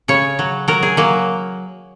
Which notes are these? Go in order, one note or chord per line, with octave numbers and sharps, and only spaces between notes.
C#3 C#5
F#3
F#3 A#4
G#4
F#3 A#3